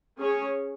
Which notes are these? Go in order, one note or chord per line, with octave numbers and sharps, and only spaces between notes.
C#4 G#4 C#5